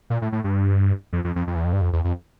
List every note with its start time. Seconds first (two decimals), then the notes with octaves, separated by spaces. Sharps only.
0.10 A#2
0.22 A2
0.32 A2
0.44 G2
1.13 F2
1.24 F2
1.36 F2
1.47 F2
1.56 E2
1.65 F2
1.73 G2
1.81 F2
1.93 E2
2.04 F2